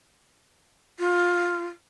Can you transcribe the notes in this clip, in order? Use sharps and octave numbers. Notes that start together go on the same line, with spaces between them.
F4